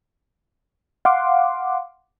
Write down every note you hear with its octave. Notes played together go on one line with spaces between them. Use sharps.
F5 F#5 C6 D6